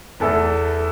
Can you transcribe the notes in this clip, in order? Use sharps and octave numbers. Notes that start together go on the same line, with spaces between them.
E2 E3 A3 A4